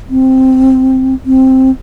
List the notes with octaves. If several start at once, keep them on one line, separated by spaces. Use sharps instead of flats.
C4
C4